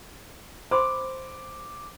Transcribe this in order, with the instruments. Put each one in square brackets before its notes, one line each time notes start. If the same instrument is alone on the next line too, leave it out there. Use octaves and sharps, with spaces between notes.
[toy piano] C5 B5 C6 [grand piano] D6